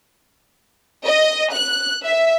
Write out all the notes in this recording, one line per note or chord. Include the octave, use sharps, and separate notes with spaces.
D#5
F#6
E5